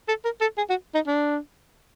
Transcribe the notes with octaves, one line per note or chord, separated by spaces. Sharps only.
A4
A#4
A4
G#4
F#4
D#4
D4